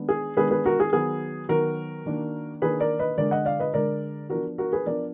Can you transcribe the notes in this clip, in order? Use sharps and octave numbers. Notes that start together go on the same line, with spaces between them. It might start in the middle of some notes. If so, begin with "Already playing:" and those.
Already playing: D#3 G#3 B3 D4
G#4
D#3 G#3 B3 D4 G#4 B4
G#4 B4
F#4 A#4
G#4
D#3 F#3 B3 G#4
D#3 F#3 B3 F#4 A#4
D#3 A#3 D4
D#3 A#3 D4 G#4 B4
A#4 D5
B4 D#5
D3 G#3 D4 A#4 D5
D#5 F#5
D5 F5
B4 D#5
D3 G#3 D4 A#4 D5
F3 B3 D4 F#4 A#4
F#4 A#4
G#4 B4
F3 B3 D4 A#4 D5